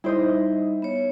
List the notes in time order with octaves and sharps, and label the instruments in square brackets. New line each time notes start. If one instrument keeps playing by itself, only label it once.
[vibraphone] G3 D#4 [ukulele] E4 C5 D#5
[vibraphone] B3 C#5